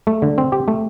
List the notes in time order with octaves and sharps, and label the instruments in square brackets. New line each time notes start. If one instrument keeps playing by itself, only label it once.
[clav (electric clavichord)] A3
D3
C4
G4
A3